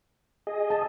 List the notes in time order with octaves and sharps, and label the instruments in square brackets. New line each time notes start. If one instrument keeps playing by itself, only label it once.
[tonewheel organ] G#4 D#5
[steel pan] A5